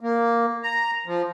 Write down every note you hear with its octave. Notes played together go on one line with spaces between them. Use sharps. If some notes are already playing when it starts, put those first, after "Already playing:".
A#3
A#5
F3